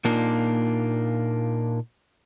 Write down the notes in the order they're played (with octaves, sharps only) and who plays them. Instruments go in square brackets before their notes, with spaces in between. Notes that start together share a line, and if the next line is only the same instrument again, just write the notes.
[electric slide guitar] A#2 A#3 D4 D#4 F4